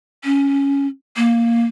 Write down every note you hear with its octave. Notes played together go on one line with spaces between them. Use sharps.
C#4
A#3